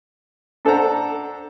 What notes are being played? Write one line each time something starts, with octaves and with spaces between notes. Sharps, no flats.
D4 A4 C5 F#5 A#5